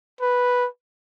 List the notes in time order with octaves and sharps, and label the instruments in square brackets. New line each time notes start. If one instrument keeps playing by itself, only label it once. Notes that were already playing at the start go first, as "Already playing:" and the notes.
[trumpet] B4